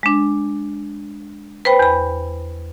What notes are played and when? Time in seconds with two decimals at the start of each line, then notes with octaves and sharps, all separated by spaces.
0.03 G#3 D4
1.65 B4 C5 G5 B5
1.79 E2 B5